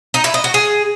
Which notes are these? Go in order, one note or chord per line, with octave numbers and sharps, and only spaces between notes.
D#4
E4
D#5
F#4
G#4